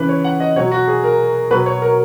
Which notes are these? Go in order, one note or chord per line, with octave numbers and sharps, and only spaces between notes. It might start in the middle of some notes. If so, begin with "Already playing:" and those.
Already playing: C#3 E3 B4
C#5
F#5
D#5
B2 F#3 C#5
F#4
G#4
A#4
B2 F#3 B4
C#5
A#4